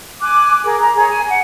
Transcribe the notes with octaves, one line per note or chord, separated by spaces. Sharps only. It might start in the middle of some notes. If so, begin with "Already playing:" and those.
G#5 D6 F#6
G#4 A#4
A#5
G#4 C#5
G#5
F#5